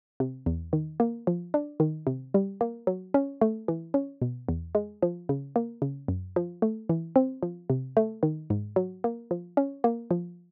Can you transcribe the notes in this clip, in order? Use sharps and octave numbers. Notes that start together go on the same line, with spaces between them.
C3
E2
D#3
A#3
F3
D4
D#3
C3
G3
A#3
F#3
C#4
A3
E3
C#4
B2
E2
G#3
F3
C#3
A#3
C#3
F#2
F3
A3
E3
C4
F3
C3
A3
D#3
G#2
F#3
A#3
F3
C#4
A#3
F3